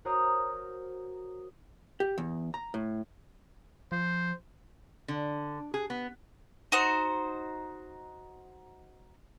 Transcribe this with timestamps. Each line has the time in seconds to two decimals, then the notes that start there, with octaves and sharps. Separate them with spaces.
0.05 F#4 A#4 C5 C#5 A#5 D#6
2.00 G4
2.18 E2
2.54 A#5
2.74 A2
3.92 F3 C5
5.08 D3
5.74 G#4
5.90 B3
6.72 D#4 F#4 C5